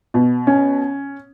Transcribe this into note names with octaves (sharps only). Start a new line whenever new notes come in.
B2
C#4